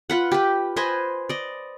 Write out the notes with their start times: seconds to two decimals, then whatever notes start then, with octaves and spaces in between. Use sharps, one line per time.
0.10 F4 B4 F#5
0.32 G4 B4
0.77 B4 C5 D#5 G#5
1.29 D5 D#5